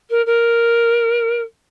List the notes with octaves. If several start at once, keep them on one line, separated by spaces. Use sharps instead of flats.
A#4
A#4